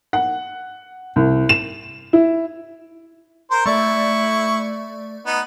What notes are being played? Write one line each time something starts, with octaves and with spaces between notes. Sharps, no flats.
F#5
C2
E7
E4
A#4 C5
A3 E4 D5 C#6
B3 D#4